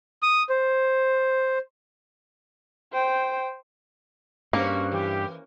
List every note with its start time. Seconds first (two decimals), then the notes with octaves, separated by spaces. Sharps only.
0.23 D#6
0.49 C5
2.93 C5 G5
4.53 G2 A#3 C#4 F#4 C5
4.92 E3 G4